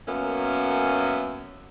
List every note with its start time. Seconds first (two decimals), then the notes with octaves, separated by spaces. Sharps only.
0.08 F#2 A#3 B3 C#4 E5